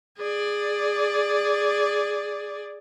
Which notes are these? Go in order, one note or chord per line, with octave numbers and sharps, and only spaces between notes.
G#4 D5